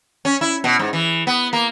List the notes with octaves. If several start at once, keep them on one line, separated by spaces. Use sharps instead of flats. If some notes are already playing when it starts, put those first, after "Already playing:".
C#4
E4
B2
G#2
E3
B3
A#3